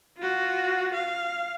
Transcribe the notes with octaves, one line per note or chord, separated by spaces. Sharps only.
F4 F#4
F5